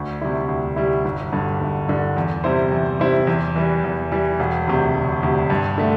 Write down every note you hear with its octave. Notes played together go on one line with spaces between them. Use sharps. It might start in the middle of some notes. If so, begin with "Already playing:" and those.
Already playing: D2
C3 G3 E4
D2
C3 G3 E4
G1
G2 D3
G1
G2 D3
E2
C3 G3 E4 C5
E2
C3 G3 E4 C5
E2
E3 G3
E2
E3 G3
E1
D2 C3
E1
D2 C3
G2
D3 A3